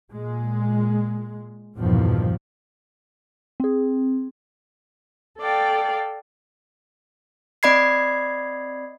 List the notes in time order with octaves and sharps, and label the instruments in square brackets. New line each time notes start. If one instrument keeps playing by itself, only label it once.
[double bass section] A#2 G#3
A#1 E2 G2 B2 D#3 F3
[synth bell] C4 G#4
[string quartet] A4 D5 F5 G5
[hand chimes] C4 D5 D#5 B5 G#6 C7